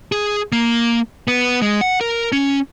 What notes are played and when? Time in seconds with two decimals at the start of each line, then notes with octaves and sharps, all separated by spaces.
0.12 G#4
0.52 A#3
1.28 B3
1.62 G#3
1.81 F#5
2.01 A#4
2.32 C#4